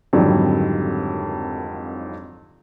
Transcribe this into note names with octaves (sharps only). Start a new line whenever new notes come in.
G#1 F2 D3 D#3 F#3 G3